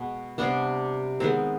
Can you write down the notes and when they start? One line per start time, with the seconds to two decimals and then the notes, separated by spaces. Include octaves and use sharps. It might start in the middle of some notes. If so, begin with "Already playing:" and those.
Already playing: B2 G#3 B3
0.38 C3 G3 B3 D4
1.20 D#3 G#3 B3 C4